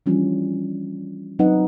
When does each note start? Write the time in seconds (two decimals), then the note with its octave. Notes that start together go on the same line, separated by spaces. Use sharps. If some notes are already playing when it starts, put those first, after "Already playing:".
0.06 E3 F3 G3 C#4 D4 F4
1.39 F#3 C4 D#4 B4 D#5 F#5